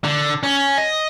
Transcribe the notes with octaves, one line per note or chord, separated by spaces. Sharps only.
D3
C#4
D#5